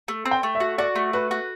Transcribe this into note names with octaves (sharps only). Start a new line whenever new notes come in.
A3
C4
G5
A3
E5
F#4
F#4 D5
A3
F#4 B4
F#4